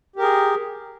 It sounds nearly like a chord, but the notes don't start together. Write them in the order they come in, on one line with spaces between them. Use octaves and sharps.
G4 A#4 G#4